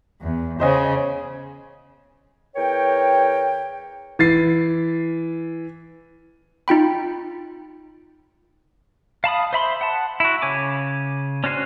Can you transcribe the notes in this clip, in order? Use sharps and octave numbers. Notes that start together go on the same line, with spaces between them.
E2
C#3 C5 D#5 G#5
E2 A#4 C#5 G5
E3 A6 C7
D#4 F4 G5 B5
F5 A5 B5 D#6
C5 E5 B5 C6
F#5 A5
E4 F#4
C#3 C#5 G#5 D6
C#4 D4 F#4 C5 G#5